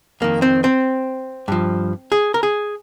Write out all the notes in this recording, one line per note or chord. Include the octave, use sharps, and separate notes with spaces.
F2 D#3 A#3
C4
C4
G2 F3
G#4
A#4
G#4